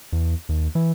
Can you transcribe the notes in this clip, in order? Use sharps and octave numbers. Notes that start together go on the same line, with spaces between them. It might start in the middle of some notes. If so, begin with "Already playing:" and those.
E2
D#2
E3